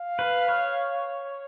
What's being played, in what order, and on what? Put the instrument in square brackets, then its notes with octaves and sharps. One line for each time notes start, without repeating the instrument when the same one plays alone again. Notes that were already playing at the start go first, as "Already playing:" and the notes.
Already playing: [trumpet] F5
[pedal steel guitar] B4
C#5